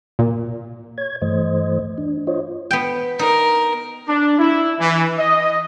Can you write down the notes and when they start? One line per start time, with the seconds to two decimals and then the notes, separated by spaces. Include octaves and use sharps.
0.19 A#2
0.98 C#5 G#6
1.22 G2 E3 A3 C5 D#5
1.98 D4
2.27 F4 C5 C#5 D#5
2.71 B3 G5
3.19 D#4 A#4
4.08 D4
4.39 E4
4.80 E3
5.18 D#5